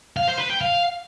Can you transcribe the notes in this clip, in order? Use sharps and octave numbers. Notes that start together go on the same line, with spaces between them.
F5
C5
B4
G5
F5